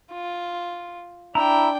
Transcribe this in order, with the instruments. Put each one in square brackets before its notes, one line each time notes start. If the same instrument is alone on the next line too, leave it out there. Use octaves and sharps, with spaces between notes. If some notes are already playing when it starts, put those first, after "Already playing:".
[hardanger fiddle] F4
[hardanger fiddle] D4 G5 [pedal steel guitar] E4 A#5